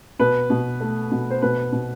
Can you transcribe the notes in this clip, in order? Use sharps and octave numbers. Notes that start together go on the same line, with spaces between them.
B2 B4
B2
A3
B2
C5
B2 B4
B2